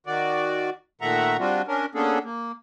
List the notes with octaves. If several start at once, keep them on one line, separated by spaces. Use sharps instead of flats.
D#3 F#4 D5
A#2 D#3 A3 E5 F#5 A#5
G3 C4 D4 F4 F#4
C#4 D4 A#4
A#3 B3 C#4 D4 G#4 A4
A#3